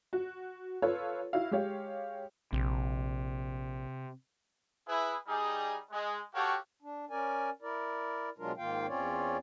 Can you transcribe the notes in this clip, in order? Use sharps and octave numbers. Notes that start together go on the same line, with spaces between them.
F#4
F4 A4 B4 C#5
E4 F#4 F5
G#3 G4 C#5 F5
A#1 C3
E4 G#4 B4
G3 D#4 G#4
G#3
F#4 G4 A4 C#5 F5 G5
D4
C#4 A#4 D5 G#5
E4 A#4 D5
B2 F#3 G#3 D4 F4 A#4
G#2 D#3 A#3 F4 F5 G5
E2 C4 C#4 F4 C#5 D5